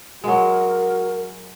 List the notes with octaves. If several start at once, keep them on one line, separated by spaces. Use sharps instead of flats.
F#3 G#3 F#4 A#4